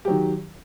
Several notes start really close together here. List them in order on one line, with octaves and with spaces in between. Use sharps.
G4 F#3 D#3